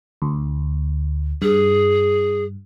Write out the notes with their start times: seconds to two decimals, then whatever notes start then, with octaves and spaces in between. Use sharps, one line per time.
0.22 D2
1.42 G2 G#4